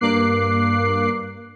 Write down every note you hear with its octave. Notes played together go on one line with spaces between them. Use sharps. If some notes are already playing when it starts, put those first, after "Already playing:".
G2 A#3 D6 F#6 C7